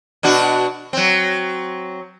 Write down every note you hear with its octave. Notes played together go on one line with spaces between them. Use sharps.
B2 D4 F#4
F#3 C4